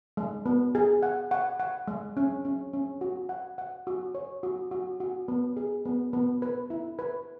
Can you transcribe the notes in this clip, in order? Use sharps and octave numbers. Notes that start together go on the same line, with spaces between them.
G#3
B3
G#4
F#5
F#5
F#5
G#3
C#4
C#4
C#4
F#4
F#5
F#5
F#4
C#5
F#4
F#4
F#4
B3
G#4
B3
B3
B4
E4
B4